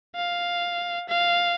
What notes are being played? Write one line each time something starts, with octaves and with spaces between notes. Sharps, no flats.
F5
F5